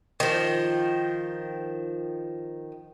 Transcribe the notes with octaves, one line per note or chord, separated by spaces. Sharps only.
D#3 F3